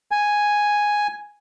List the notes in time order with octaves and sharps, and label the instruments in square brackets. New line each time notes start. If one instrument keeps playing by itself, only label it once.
[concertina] G#5